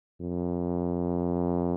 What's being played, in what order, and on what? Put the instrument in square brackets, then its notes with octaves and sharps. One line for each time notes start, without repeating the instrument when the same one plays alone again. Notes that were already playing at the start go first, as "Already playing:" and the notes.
[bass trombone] F2